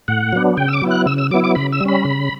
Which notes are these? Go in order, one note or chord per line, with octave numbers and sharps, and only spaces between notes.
A2 F#5
F#3 B3 D4
C#3 G5
E6
D6
F#3 B3 E4
F#6
C#3 E6
E6
F#3 B3 E4 D6
D6
C#3 B5
E6
G3
C#4 B5
C#3